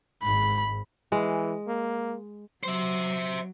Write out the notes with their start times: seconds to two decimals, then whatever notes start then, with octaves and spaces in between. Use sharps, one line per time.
0.23 G#1 G#2 B5
1.12 E3 G#3
1.68 A#3
2.63 F#3 C5 E5